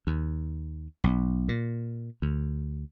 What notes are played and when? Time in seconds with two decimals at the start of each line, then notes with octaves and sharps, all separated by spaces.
0.07 D#2
1.04 B1
1.49 A#2
2.22 D2